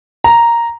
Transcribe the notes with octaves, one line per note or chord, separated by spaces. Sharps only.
A#5